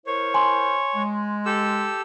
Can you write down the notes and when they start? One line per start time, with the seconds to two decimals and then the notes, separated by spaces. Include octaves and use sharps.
0.06 E4 A#4 C5 C#5
0.34 G#5 C6
0.95 G#3
1.46 G4 A4 E6